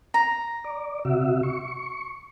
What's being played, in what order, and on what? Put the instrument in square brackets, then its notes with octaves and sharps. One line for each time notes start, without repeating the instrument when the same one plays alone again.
[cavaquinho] A#5
[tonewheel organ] D5
C3 F#4 E5
C#6